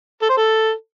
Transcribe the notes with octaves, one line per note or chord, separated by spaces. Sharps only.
A4
C5
A4